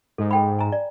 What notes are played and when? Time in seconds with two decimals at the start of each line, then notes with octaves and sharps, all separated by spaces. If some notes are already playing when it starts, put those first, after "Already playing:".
0.18 G#2 A4
0.31 A4 G5 B5
0.59 G#5 A#5
0.72 D5